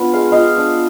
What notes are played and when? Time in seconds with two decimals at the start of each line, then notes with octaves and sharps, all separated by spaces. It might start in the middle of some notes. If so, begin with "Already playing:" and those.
Already playing: B3 D4 F4
0.13 G#3 F5
0.32 F4 D#5 F5
0.58 D4